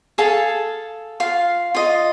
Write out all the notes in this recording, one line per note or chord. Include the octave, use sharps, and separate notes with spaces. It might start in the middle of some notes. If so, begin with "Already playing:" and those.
G#4 A4 F5 A5
F4 F5
F4 D#5